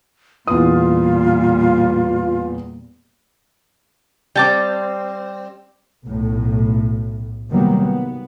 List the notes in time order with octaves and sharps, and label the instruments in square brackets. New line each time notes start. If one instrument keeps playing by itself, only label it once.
[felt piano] E2 D#6 [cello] A#2 G3 [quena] F4
[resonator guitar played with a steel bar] G3 C4 [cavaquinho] G5 A5 D6
[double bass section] B1 A2
C3 D#3 F#3 G3 A#3 B3
B3